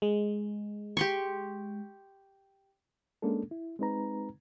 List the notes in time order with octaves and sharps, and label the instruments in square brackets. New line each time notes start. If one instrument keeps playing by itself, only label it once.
[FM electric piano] G#3
[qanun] G4 C6 C#6
[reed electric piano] G#3 A#3 C#4 D4 A4
E4
G#3 C4 D#4 B4 A#5